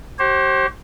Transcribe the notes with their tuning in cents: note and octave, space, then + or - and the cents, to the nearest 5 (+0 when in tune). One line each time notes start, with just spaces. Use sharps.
G4 -35 C5 +35